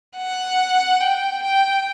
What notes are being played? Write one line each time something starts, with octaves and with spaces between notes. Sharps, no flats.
F#5
G5
G5